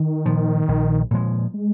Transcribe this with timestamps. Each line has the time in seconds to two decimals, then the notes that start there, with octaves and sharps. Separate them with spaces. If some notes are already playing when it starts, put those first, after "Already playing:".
Already playing: D#3
0.26 A#2 F3
0.68 A#1
1.11 A#2 F3 G#3
1.54 G#3